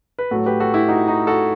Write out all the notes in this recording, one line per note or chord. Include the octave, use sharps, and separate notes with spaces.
B4
A2 F#3 A3 F#4 A4
G4 B4
F#4 A4
E4 G4
D#4 F#4
D#4 F#4
F#4 A4